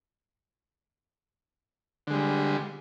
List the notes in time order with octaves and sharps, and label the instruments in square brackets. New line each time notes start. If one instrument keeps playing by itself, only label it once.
[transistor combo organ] D3
G#3
G3